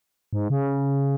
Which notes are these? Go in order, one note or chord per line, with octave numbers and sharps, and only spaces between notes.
G#2
C#3